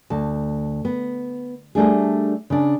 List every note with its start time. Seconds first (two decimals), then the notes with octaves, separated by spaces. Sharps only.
0.10 D2 A5
0.85 B3
1.75 G3 A3 D4 G#4
2.50 C#3 D4